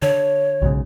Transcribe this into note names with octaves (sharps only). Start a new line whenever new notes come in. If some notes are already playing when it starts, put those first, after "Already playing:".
D3 C#5
B1 G#2 C#3